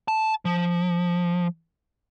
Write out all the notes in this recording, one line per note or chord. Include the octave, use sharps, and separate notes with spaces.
A5
F3